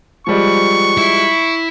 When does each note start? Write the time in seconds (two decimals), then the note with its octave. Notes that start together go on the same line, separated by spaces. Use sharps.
0.27 F3 G3 G#3 C#6
0.98 E4